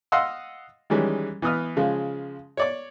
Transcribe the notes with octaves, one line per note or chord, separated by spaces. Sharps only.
D#5 F5 F#5 C6 D#6 E6
D#3 E3 G3 G#3 C#4
E3 B3 D#6 F6
C#3 F3 G#3
C#5 D5 D6